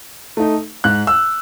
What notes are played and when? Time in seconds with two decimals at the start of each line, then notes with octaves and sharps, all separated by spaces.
0.37 A3 D#4
0.84 G#2 F#6
1.07 E6